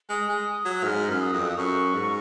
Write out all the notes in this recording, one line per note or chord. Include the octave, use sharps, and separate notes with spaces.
G#3 D#6
G#3
F#3
G#2 F6
F#2
D#6
F2
F#2 C#6
G#2